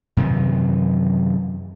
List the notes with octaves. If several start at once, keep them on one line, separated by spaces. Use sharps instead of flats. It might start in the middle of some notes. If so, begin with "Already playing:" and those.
F#2 C3 D#3 E3